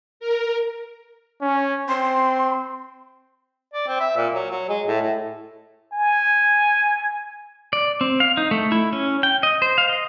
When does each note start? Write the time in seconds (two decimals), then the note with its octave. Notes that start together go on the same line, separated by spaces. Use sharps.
0.20 A#4
1.42 C#4
1.89 C4 C6
3.74 D5
3.87 C4
4.00 E5
4.16 A#2
4.34 F#3
4.50 F#3
4.69 G#3
4.87 A2
5.02 A2
5.92 G#5
7.73 D5
8.01 C4
8.20 F5
8.37 D#4
8.51 A3
8.72 E4
8.93 C#4
9.23 G5
9.43 D#5
9.62 C5
9.78 F5
9.89 D#5